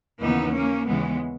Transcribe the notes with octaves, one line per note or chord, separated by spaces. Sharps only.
D#2 C#3 E3 B3 D#4
A#3 C#4
D#2 C#3 E3 G#3 B3